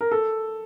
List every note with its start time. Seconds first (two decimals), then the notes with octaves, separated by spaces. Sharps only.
0.01 A#4
0.11 A4